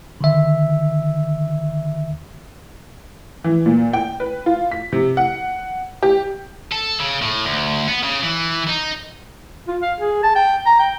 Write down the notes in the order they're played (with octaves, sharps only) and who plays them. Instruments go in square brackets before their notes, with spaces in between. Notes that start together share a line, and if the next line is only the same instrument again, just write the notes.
[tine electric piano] D3 D#3 E5
[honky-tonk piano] E3
A#2
G5
B4
F4
B6
C3
F#5
G4
[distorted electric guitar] A4
C#3
A2
D2
B3
C#3
E3
D#4
[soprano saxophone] F4
F5
G#4
A5
G5
A#5
G5